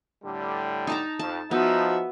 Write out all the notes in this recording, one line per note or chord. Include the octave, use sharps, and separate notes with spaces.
A2 D3 G3
D#4 A5 A#5
F2 A5
F3 B3 D#4 F#4 E5